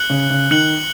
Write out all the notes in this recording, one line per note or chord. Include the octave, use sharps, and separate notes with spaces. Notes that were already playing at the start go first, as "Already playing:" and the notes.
Already playing: F#6 C#7 F#7
C#3
C#3
D#3 F#6 C#7 F#7